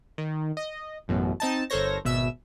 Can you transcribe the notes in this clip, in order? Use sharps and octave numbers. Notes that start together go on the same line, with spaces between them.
D#3
D#5
A1 F#2 B2
C4 D#4 A5
G1 A4 A#4 C5 C#5 A#6
G#1 B2 E5 E6